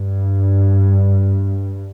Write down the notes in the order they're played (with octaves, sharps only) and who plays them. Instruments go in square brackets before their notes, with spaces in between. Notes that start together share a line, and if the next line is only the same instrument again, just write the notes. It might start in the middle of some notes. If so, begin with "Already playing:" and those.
Already playing: [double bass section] G2